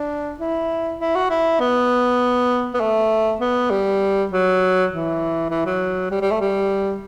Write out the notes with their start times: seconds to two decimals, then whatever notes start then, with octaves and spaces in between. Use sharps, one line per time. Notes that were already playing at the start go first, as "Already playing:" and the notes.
Already playing: D4
0.40 E4
1.00 E4
1.15 F#4
1.30 E4
1.60 B3
2.74 B3
2.81 A3
3.40 B3
3.71 G3
4.31 F#3
4.91 E3
5.50 E3
5.66 F#3
6.11 G3
6.21 G3
6.31 A3
6.41 G3